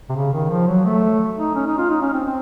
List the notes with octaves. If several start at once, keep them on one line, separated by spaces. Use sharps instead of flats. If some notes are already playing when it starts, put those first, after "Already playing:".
C3
C#3
D#3
F3
F#3
A3
D#4
C#4
D#4
F4
D#4
C#4
C4
C4